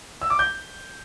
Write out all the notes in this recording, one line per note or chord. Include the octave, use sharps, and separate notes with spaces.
E6
D6
G6